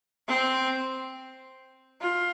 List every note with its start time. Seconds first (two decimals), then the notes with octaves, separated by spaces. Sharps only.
0.28 C4
2.01 F4